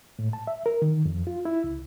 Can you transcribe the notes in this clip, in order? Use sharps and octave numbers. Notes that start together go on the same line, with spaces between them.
A2
A5
E5
A#4
D#3
F2
F4
E4
C#2